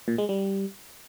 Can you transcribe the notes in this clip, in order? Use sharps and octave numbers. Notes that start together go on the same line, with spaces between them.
A#2
G#3
G3